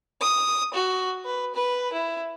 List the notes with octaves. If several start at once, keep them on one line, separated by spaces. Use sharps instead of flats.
D#6
F#4
B4
B4
E4